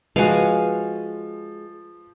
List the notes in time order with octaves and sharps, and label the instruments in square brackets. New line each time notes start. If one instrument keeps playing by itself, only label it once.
[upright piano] F3 [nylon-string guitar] G#3 [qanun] F#4 F5 [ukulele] B4 G#5